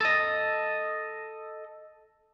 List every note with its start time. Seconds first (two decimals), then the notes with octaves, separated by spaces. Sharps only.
0.01 A4 D#5